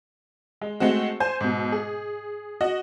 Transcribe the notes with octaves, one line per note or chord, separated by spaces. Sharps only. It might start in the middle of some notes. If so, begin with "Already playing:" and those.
G#3
G#3 A3 C4 F#4
C5 G#5 G6
G#2 B2
G#4
F#4 D#5